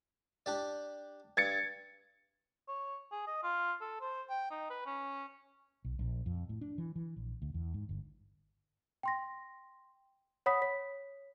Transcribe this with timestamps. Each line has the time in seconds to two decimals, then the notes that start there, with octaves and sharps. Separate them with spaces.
0.46 D4 G4 D5
1.37 G2 G#6 A6 C#7
2.68 C#5
3.12 G#4
3.27 D#5
3.43 F4
3.81 A4
4.01 C5
4.30 G5
4.50 D#4
4.70 B4
4.86 C#4
5.85 B1
5.99 A#1
6.26 F2
6.49 A2
6.61 D4
6.78 E3
6.96 E3
7.16 A#1
7.42 D2
7.54 E2
7.74 G#2
7.89 G1
9.03 G5 C6 A#6
10.46 C#5 F#5 B5 D#6 B6
10.62 C#5 B6